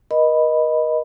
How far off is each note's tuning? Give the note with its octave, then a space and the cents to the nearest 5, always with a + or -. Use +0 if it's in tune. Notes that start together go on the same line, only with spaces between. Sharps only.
A#4 +45 D#5 +0 B5 +0